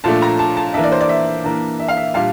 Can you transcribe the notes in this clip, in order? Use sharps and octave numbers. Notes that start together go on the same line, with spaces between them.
A#2 F3 A3 D4 A5
A#5
A5
A5
E3 A#3 D4 E5
D5
C5
D5
E5
E3 A#3 D4
E5
F5
E5
A#2 G3 D4 F5